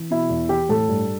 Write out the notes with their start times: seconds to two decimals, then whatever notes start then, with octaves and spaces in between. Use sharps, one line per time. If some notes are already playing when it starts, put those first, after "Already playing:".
Already playing: E3
0.10 B2 E4
0.30 E2
0.49 E3 G4
0.69 A2 A4
0.88 G2